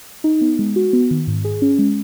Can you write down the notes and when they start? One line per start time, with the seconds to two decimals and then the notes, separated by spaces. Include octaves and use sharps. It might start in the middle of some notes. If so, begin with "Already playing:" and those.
0.24 D#4
0.41 B3
0.59 G#3
0.76 F#4
0.93 B3
1.11 D#3
1.27 G#2
1.45 G#4
1.62 C#4
1.79 G#3